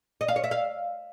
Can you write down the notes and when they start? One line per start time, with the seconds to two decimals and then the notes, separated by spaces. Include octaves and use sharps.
0.21 D#5
0.28 F5
0.36 C#5
0.44 E5
0.51 F5